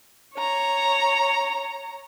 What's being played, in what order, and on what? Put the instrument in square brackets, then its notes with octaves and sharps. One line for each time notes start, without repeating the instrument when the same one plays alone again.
[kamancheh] C#5 A#5